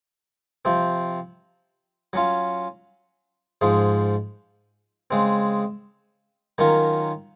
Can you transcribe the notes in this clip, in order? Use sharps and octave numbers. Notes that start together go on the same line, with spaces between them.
C3 F3 C4
F#3 C#4 F4
G#2 F3 G#3
C#3 G#3 C4
D#3 F#3 C#4 F4 A#4